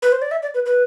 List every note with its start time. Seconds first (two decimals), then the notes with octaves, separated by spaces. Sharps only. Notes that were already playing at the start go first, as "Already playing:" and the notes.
0.02 B4
0.12 C5
0.22 D5
0.31 E5
0.42 D5
0.54 B4
0.66 B4